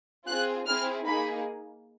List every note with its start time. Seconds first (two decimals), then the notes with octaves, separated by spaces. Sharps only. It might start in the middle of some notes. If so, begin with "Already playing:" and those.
0.27 C4 F4 G#4 F#6
0.67 C4 E4 G#4 F6
1.06 A#3 D#4 G#4 B5